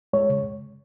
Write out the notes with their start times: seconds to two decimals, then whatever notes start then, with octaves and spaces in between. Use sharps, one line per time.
0.13 G#3 C#5
0.30 C#3